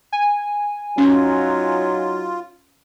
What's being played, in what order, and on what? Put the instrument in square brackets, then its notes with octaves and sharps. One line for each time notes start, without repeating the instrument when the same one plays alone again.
[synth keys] G#5
[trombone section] F#3 D#4 [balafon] C#4 [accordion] F4